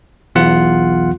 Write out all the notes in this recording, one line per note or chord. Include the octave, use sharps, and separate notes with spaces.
B1 E2 F4 F#5